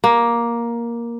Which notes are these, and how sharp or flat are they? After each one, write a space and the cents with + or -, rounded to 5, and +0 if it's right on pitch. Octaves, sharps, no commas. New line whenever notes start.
A#3 +10